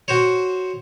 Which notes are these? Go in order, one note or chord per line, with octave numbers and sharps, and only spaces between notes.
F#4 C5 C#5